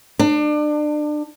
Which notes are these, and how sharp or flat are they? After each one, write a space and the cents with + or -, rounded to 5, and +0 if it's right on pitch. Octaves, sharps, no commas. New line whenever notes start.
D4 +30